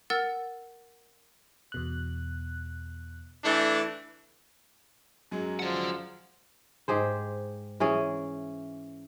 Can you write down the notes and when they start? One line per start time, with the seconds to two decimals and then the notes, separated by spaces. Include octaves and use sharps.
0.10 A#4 F#5 E6 A6
1.72 E2 B2 F#6
3.44 E3 A3 D4
5.31 F#2 F#3 G#3
5.59 F3 D5 F#5
6.88 G#2 G4 G#4 C5
7.80 E3 C#4 G#4